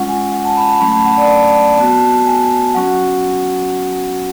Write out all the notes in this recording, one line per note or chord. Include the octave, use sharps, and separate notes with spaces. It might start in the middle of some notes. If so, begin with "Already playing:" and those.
Already playing: G#3 C#4 F4 F#5
G#5
F#5
A5
B5
A5
F#3 A3 C#4 B5
A5
F#5
D5
A5
B3 F#4 A5
G#5
F#3 C#4 F#4 F#5